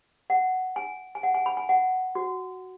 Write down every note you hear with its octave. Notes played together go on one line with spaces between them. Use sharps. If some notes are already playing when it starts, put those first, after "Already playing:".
F#5
G#5
G#5
F#5
G#5
B5
G#5
F#5
F#4